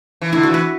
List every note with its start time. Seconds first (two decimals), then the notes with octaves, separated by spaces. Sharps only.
0.21 E3
0.33 D3 E4
0.43 F#4
0.50 E3 B4